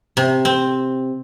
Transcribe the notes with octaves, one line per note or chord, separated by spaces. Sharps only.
C3
C4